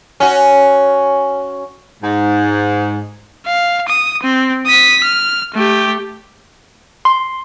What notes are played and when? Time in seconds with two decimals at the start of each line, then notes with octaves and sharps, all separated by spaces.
0.20 C#4 F#4
2.02 G#2
3.46 F5
3.88 D#6
4.23 C4
4.66 D#6 B6
5.04 F6
5.54 A3 G4
7.05 C6